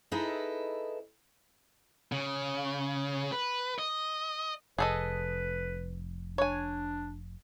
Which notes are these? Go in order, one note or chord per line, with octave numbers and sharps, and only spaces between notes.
D#4 E4 G#4 A4 B4 D#5
C#3
B4
D#5
F1 G#4 A4 B4 D#5
D4 C#5 G#5